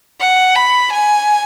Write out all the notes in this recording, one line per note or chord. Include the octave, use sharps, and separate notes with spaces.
F#5
B5
G#5